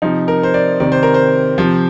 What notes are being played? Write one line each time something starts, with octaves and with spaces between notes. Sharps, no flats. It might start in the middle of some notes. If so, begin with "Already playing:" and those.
C3 F3 D#4
A#4
C5
D5
C3 D#3 D5
C5
A#4
C5
C3 F3